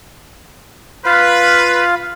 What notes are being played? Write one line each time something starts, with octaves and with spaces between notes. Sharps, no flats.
F4 B4 F5